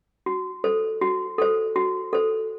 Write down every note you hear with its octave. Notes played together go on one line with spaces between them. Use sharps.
F#4
A4 C5
F#4
A4 C5
F#4
A4 C5